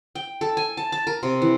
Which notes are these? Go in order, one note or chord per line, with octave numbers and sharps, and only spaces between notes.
G5
A4
G#5
A5
A5
A#4
C3
E3